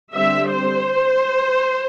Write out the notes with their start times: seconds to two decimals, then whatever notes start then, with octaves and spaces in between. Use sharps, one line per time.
0.14 D3 G3 C4 E5
0.53 C5